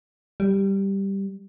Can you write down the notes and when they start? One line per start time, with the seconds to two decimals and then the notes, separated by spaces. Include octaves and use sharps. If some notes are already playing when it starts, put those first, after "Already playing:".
0.40 G3